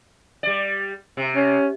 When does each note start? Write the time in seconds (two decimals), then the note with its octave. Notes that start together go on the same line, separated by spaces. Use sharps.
0.43 G3 D5
1.17 C3
1.36 C#4